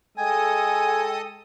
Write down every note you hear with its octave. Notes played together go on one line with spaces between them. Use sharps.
G#3 A4 D#5 G5 G#5 D#6